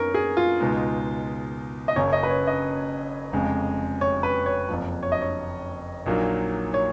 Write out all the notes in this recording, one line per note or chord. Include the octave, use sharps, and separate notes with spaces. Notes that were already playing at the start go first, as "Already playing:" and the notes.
Already playing: F#2 B3 D#4 A#4 C#5
G#4
F4
C#2 B2 G#3 D#4
D#5
F#1 F#2 C#3 C#5
D#5
B4
C#5
D#5
F1 F2 C#3 G#3
C#5
B4
C#5
F#1 F2 F3
C#5
D#5
C#5
A#1 A#2 F#3 A#3 D#4
C#5